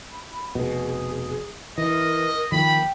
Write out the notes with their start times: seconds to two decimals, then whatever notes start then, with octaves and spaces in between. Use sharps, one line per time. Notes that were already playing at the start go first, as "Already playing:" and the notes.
0.11 B5
0.55 F1 B2 G#4
1.78 E3 A#4 D#5
2.52 D#3 F3 A#3 G5 B5